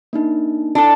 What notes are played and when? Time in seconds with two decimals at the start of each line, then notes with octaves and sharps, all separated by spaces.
0.13 A#3 D4 D#4
0.75 D4 E4 A4